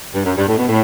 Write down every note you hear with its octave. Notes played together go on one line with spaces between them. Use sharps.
G2
F#2
G2
A2
B2
A2